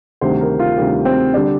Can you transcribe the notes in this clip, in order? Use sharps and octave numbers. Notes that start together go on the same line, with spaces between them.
D2 C3 D#3 G3 C5
A#4
F4
D2 C3 D#3 G3
C4
D3 G3 D4